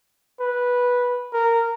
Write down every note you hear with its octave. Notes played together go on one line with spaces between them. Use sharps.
B4
A#4